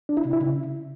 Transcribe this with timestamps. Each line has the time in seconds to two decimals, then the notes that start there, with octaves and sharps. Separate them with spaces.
0.09 D4
0.17 E4
0.25 C3
0.33 E4
0.41 C#3